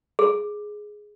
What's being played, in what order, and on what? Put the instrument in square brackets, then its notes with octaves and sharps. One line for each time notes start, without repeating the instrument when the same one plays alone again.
[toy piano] G#4